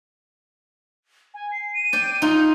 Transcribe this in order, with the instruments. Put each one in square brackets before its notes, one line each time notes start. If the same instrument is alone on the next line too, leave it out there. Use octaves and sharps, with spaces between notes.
[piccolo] G#5
C7
D#7
[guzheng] D5 G5
[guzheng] D#4 F4 [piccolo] G6